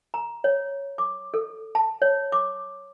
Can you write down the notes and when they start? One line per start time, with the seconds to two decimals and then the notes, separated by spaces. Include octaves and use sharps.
0.14 A#5
0.44 C#5
0.98 D6
1.34 A4
1.75 A5
2.02 C#5
2.32 D6